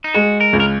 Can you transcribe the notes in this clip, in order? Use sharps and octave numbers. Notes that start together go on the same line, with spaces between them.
D#4
G#3 F#4
A#4
C#2
A#4